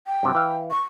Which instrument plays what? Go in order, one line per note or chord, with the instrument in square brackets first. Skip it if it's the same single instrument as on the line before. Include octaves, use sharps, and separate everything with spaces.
[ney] G5
[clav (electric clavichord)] G2 C3 F#3
E3 F5
[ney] C#6